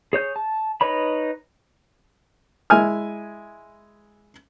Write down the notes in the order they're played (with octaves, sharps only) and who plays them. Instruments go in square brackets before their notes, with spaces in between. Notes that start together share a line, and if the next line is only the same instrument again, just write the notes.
[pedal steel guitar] G#4 C#5 G6
A5
D#4 B4 C#5 B5
[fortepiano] G#3 E4 G#5 F6